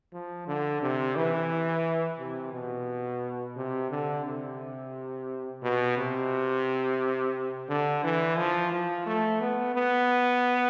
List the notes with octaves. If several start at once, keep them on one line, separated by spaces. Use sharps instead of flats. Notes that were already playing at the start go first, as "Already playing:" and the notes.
F3
D3
C3
E3
C3
B2
C3
D3
C3
B2
C3
D3
E3
F3
F3
A3
B3
B3